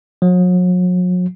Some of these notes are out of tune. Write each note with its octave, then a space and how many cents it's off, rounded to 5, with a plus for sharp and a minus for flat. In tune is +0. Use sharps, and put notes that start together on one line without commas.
F#3 -40